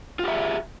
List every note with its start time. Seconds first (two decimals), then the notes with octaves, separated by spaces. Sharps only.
0.19 F4
0.24 G4
0.28 E5
0.32 G#4